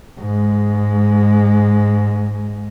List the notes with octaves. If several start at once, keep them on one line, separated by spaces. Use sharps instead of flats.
G#2 G#3